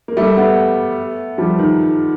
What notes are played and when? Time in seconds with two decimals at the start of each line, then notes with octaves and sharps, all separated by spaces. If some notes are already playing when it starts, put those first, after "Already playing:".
0.08 A#3
0.17 G3 A3
0.37 A3 B3
1.38 F3 G3
1.59 D#3